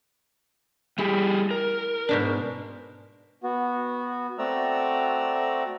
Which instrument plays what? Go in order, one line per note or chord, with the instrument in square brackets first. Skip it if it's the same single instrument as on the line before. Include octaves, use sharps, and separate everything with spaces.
[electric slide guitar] G3 G4 G#4 [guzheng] E4
[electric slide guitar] A#4
[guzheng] G#2 B2 D4
[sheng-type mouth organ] B3 F#4
A3 C4 F#4 D5 A#5 E6